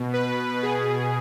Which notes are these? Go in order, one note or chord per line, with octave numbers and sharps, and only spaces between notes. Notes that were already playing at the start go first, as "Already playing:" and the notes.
Already playing: B2
B4
B2 G#4